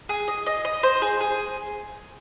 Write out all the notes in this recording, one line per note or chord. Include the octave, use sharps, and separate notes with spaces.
G#4
D#5
D#5
D#5
C5
G#4
G#4